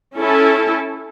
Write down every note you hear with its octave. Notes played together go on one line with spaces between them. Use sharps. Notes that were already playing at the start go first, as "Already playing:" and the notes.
C#4 E4 A4